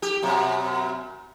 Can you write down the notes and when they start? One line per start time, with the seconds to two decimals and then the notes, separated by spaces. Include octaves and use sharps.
0.02 G4
0.22 F#2 B2